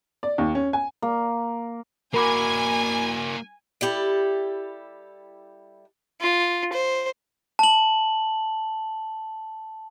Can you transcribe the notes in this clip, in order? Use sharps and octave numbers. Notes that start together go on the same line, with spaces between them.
D5
D#2
C#4
G#5
A#3
A#3 F#4 A#4 G#5 B5 D6
G3 E4 G4 A4
F4
C5
A5 F#7